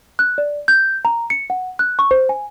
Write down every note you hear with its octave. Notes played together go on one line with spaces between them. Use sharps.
F#6
D5
G6
A#5
C#7
F#5
F#6
C#6
C5
G#5